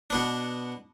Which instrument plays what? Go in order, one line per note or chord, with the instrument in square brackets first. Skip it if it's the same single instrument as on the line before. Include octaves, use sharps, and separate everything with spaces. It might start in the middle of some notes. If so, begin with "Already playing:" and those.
[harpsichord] B2 B3 D4